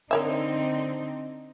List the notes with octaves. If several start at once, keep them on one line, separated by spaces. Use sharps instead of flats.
D3 C4 D#4 A#4 C#5 E5